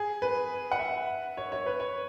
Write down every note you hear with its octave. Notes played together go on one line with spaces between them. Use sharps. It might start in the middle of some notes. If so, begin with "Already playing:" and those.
Already playing: G#4
B4
F#5
E5
C#5
C#5
B4
C#5